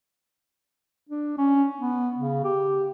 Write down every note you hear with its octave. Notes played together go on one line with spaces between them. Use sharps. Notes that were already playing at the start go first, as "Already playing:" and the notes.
D4
C#4
B3
C#3
G4